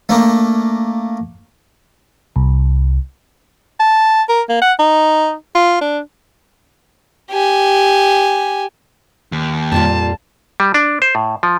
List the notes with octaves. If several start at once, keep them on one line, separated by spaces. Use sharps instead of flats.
A3 A#3 D4
C2
A5
A#4
A#3
F#5
D#4
F4
D4
G4 G#5
D#2
F2 A#2 G3 F4 A5
G3
D4
C5
A2
F3